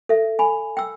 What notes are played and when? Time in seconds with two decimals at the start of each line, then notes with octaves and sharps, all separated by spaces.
0.09 A4 E5
0.39 G#5 B5
0.77 G5 E6